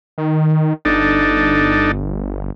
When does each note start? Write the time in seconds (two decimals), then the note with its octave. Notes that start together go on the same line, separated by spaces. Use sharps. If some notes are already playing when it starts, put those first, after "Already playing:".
0.18 D#3
0.85 G1 D4 D#4 A4